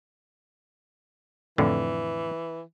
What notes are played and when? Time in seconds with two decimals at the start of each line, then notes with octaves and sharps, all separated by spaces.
1.58 F2 A2 D3 E3